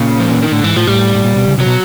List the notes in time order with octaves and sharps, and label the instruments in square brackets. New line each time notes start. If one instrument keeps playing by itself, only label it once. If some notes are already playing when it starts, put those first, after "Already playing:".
Already playing: [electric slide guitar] A#2 [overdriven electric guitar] C#3
[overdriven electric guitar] F3
E3
D#3
[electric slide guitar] A2 [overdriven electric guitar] D3
[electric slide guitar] G#2 [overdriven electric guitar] E3
[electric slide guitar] A2 [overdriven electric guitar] F3
[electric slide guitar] A2 [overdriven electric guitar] G3
[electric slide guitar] A2
A#2
B2
C#3
[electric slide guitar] C3 [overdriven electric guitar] F#3
[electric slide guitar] B2